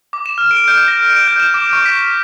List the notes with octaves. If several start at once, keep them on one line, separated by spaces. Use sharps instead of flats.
D6
E7
F6
D7
G6
A#6
D7
G6
E7
D6
C#6
B6